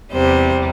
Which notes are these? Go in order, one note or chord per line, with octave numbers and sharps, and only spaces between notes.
E2 C3 G3 C5